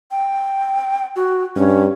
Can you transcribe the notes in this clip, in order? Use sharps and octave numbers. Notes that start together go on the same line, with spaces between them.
G5
F#4
G2 C#4